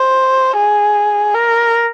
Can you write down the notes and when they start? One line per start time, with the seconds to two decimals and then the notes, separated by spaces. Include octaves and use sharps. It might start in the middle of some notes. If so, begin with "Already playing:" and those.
Already playing: C5
0.57 G#4
1.35 A#4